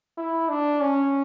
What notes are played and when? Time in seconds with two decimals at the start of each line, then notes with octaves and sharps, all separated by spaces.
0.18 E4
0.49 D4
0.81 C#4